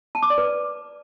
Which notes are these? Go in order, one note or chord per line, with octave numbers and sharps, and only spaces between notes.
A5
D6
D5
B4